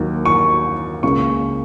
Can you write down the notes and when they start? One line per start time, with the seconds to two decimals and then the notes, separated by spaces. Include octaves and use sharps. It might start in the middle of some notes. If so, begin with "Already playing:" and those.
Already playing: D#2 D#3 F#3 A#3
0.26 C#6
1.03 C#2 C#3 A#3 C#6